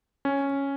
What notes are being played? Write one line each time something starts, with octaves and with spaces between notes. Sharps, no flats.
C#4